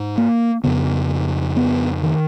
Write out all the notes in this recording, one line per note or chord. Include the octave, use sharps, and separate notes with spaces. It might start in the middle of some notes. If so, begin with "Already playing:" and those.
Already playing: G#2
A#3
F2 C#3 B3
B3
D#3